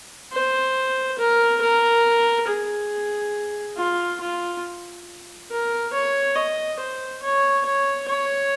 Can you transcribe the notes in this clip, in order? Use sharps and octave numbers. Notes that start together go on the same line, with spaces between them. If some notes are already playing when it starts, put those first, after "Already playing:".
C5
A#4
A#4
G#4
F4
F4
A#4
C#5
D#5
C5
C#5
C#5
C#5